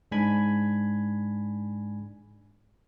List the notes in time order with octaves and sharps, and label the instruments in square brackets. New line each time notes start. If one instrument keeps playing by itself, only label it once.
[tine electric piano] G#2 G#3 D4 G#5 B5 G#6